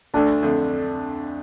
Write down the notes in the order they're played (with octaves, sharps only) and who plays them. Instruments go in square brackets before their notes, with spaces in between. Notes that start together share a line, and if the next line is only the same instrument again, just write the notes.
[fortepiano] D2 D3 A3 [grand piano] D4
[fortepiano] F2 D3 A3